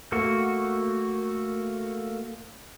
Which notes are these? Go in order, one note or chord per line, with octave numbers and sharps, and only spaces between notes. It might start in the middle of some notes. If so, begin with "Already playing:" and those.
A3 A#3 F#4